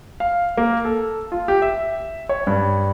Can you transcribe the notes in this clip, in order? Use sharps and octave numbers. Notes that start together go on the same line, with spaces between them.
F5
A#3
A4
F4
G4
E5
C#5
G2